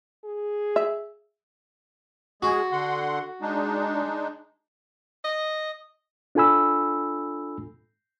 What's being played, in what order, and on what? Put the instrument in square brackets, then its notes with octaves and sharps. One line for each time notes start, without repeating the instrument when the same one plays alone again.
[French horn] G#4
[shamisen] E5
[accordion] G#3 G#4 [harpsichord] F#4
[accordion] D3 F#5 C6
G#3 D4 D#4
[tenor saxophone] D#5
[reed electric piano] D4 F4 A4 G#5 B5 E6